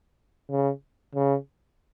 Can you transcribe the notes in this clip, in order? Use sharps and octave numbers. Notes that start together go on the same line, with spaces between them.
C#3
C#3